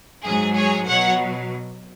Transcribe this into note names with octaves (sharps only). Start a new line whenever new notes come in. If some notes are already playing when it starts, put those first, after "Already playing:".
G#2 F#3 G#4
G#4 C#5
B2 F#3 C#5 F#5